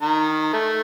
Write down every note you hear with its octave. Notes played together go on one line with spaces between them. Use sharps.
D#3 A#5
A3